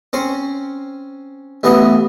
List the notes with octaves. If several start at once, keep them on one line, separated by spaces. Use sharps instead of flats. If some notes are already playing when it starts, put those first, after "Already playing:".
C4 C#4 C5
A1 E3 B3 D#5